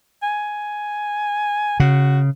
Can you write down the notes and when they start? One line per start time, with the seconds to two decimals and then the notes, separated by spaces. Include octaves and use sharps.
0.23 G#5
1.80 C#3 F#4